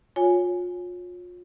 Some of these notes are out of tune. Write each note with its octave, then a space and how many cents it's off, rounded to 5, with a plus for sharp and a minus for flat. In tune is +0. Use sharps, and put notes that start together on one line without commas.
F4 +35 C#5 +0 G#5 +0